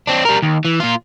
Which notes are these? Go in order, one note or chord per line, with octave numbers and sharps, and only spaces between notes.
C4 D4
G3 A#4
D#2
E3
A#2 F4